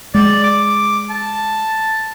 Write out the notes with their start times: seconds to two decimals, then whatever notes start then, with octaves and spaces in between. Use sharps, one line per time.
0.14 G#3 D5
0.44 D6
1.10 A5